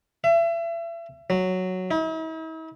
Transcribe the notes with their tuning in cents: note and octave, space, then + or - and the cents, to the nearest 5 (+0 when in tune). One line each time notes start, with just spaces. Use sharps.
E5 +35
F#3 +0
E4 -45